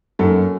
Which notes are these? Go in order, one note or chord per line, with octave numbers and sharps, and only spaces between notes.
F#2 A4